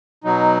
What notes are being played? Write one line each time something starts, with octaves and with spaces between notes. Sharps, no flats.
B2 F#3 D#4